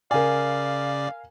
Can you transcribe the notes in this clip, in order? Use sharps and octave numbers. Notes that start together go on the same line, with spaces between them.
C#3 A#4 D5 F5 G#5